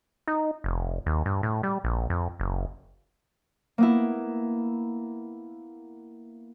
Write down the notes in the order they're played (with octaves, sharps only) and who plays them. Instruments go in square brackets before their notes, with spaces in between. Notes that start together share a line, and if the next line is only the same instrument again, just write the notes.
[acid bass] D#4
F1
D#2
G2
A2
G3
A#1
F2
F#1
[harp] A#3 B3 E4